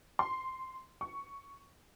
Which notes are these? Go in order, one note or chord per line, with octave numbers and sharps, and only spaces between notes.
C6
C#6